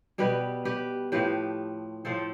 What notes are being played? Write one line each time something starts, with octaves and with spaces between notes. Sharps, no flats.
B2 G3 G4 B4
G4 B4
A2 F3 A3 G4 B4
A2 F3 A3 A4 C5